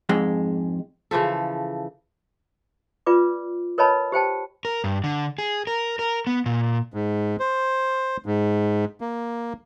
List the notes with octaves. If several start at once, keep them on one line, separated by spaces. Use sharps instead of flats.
F2 G#2 G#3
C#3 E3 F3 A4
F4 B4 D5 D6
A#4 B4 C#5 D#5 A5 B5
G4 C5 G5 A5
A#4
G2
D3
G#4
A#4
A#4
B3
A#2
G#2
C5
G#2
A#3